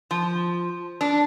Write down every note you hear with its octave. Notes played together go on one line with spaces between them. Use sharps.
F3
D4